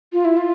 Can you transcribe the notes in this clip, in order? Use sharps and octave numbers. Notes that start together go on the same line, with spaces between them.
F4
E4
F4